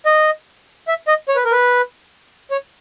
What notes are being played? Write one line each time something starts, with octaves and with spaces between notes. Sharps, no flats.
D#5
E5
D#5
C#5
B4
A#4
B4
C#5